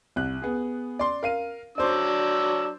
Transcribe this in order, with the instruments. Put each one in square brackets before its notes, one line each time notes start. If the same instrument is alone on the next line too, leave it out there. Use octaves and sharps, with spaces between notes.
[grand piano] C2 F#6
B3 G#4
D5 C6
A#4 F5 D#7
[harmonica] F#3 D4 E6 [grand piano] C5 D5